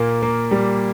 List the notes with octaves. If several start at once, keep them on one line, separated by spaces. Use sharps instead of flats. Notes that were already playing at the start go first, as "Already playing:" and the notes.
Already playing: A#2 A#3
A#3
G3